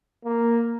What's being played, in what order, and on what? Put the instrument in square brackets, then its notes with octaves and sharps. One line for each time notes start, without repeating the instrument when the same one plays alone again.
[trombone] A#3